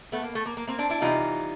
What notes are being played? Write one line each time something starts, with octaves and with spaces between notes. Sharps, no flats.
A3 B3
A#3
A3
A#3
A#3
A#3 C4
C4 D4
D4 E4
C3 E3 G3 D#4 F4